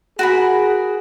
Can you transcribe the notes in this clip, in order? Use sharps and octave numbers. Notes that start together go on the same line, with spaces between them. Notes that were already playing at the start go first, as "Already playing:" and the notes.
F#4 G#4 A#4 B5